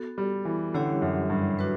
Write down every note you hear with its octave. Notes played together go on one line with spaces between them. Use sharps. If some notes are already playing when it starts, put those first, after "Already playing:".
Already playing: B3 F#4 A4
G3
E3
D3 G3 C#4 E4 G4 C#5
F#2
G2
D4 F#4 B4